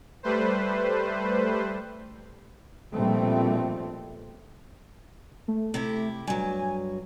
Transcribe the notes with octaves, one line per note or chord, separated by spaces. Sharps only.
G3 A3 B4 C5
A#1 B2 G3 A3 C4
A3
C3 E4 G4
G2 F#3 G#5